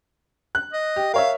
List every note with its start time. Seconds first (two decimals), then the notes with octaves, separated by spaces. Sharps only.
0.55 F#6
0.73 D#5
0.96 G4
1.14 A#4 C#5 E5 F5